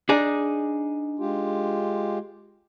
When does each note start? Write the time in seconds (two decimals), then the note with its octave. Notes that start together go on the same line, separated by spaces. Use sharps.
0.09 D4 D#4 G#4
1.19 G#3 F4 G4